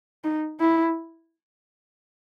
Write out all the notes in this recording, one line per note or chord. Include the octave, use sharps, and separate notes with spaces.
D#4
E4